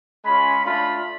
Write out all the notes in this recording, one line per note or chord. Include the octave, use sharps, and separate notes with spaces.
G#3 C#4 F4 B5
A3 D4 F4 B5